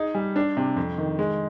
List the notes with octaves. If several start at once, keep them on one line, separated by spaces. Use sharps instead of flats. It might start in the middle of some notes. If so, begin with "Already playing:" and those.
Already playing: D#4 G#4
G3
D4
C3
F2
D#3
G#3